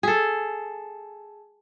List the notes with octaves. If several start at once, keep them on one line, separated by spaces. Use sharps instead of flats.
G#4 A4